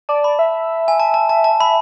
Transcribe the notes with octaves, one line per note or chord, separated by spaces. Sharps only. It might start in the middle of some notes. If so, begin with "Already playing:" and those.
D5 A5
B5
E5
G#5
A5
A5
A5
A5
E5 B5